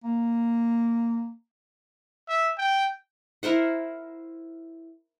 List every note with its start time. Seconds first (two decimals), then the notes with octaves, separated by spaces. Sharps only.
0.04 A#3
2.28 E5
2.58 G5
3.43 E4 A#4 C5 F#5